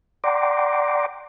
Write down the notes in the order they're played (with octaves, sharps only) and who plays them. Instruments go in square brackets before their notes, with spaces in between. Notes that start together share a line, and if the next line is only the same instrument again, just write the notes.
[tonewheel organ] D5 F#5 G5 A#5 C6 D6